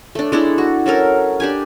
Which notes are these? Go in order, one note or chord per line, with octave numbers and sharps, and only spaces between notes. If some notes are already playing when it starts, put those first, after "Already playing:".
A3 D4
G#3 D4 E4 A4
F#4
F#3 C#4 A4 A#4
D4 G4 G#5